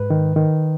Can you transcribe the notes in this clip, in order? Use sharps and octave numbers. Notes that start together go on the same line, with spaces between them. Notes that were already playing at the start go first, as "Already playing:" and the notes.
Already playing: G#2 B4
D#3
D#3